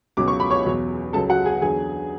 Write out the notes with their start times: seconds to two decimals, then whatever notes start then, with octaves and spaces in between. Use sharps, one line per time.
0.17 C#2 B2 F#3 D6
0.28 C#6
0.40 B5
0.50 C#5 C#6
0.65 E2 B2 F#3
1.13 C#2 C#3 F#3 A4 A5
1.30 F#4 F#5
1.45 G#4 G#5
1.62 E2 D3 F#3 G#4 G#5